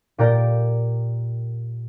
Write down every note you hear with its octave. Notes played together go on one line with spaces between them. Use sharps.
A#2 G4 A#4 D5 A#5 G6